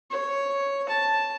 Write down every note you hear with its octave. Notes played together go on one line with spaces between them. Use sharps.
C#5
A5